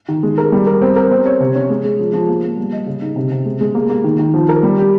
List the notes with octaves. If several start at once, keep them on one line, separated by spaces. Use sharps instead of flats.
D#3
G#3
A#4
G3
A#4
C4
A#4
C4
C#5
C3
C#4
G#3
G#3
F3
F3
A#3
A#3
G3
D#5
C#3
D#4
C3
C3
G#3
G#3
A#3
A#3
D#3
D#3
F3
A#4
G3
G4